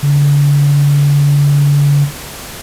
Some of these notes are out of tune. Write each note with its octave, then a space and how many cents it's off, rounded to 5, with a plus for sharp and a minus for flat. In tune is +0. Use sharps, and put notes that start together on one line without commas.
D3 -40